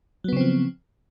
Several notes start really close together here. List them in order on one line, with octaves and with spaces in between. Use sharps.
F#3 B3 C#3 C4 F3